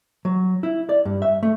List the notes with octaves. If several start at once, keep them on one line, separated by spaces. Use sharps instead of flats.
F#3
E4
D5
G2
E5
A3